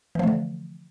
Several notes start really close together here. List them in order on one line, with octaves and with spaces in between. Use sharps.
E3 F3 A3 D3